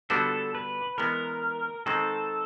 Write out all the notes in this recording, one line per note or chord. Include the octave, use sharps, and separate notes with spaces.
D3 G3 B3 D4 F#4 A4
B4
E3 G#3 B3 A#4
D#3 G#3 C4 A4